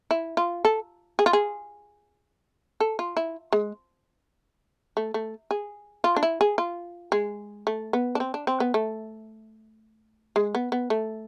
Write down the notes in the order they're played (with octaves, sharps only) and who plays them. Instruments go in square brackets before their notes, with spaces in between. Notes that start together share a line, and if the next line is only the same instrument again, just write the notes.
[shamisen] E4
F4
A4
G#4
F4
G#4
A4
F4
E4
G#3
A3
A3
G#4
F4
D4
E4
G#4
F4
G#3
A3
B3
D4
C4
D4
C4
B3
A3
G#3
B3
B3
A3